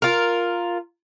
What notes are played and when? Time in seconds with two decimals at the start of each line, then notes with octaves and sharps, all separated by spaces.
0.02 F4 A#4